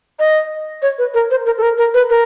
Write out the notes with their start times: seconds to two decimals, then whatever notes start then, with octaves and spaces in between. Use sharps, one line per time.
0.19 D#5
0.82 C#5
0.98 B4
1.14 A#4
1.31 C5
1.46 A#4
1.58 A4
1.62 A#4
1.78 A#4
1.94 B4
2.10 A#4